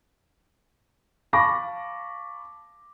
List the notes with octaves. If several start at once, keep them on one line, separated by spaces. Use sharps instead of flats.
F5 A5 B5 C#6 D6 A#6